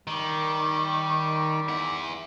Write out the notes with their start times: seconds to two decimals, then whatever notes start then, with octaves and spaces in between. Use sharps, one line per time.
0.07 D#3 G3
1.68 E4 F#5